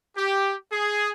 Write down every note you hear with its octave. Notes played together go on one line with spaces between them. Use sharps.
G4
G#4